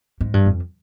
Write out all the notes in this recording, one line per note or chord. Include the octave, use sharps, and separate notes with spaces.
G#2
G2
F2